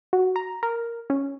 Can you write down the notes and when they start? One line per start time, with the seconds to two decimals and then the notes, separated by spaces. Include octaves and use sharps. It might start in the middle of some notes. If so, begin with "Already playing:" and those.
0.13 F#4
0.36 A#5
0.63 A#4
1.10 C#4